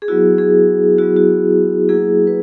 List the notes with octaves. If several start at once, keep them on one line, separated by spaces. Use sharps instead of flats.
G#4
F#3 B3 E4 F#4
G#4
F#3 B3 E4 F#4
F#4
F#3 A#3 E4 G#4
B4